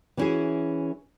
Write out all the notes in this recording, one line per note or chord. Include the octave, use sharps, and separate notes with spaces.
E3 B3 C#4 E4 F#4 G#4